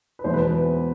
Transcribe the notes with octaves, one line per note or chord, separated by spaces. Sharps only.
B4
E2 B2 G#3 C5
B4